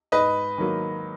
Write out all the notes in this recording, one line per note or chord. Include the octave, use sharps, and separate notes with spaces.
G#2 B4 D#5
D#3 F#3 A#3